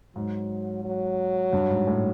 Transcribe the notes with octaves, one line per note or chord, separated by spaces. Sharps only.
G#2 F#3
F#3
G2
G#2
A2